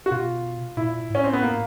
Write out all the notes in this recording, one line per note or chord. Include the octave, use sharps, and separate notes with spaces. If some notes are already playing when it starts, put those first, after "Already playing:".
F#4
B2 F4
A#2 E4
A2 C#4
C4
B3
A#3